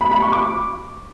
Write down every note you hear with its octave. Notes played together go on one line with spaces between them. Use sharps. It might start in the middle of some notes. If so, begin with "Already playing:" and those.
B5
B5
C#6
D6